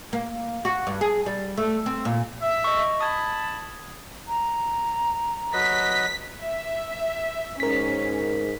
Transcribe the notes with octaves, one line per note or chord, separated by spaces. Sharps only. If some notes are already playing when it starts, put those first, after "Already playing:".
A#3
F#4
G2
G#4
G3
A3
C4
A#2
E5
D#5 C#6
A5 B5 D#6 G#6
A#5
F#3 B4 D#5 B6
E5
G#2 C#4 A#4 B6